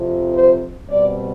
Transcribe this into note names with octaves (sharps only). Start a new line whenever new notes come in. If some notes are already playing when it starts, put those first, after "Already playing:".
Already playing: F2 C3 F3
C5
B2 G3 C4 D5